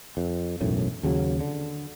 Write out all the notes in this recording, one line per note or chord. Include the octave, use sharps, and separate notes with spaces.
F2
E1 B1 F#2 A2
D#2 C#3 F#3
D3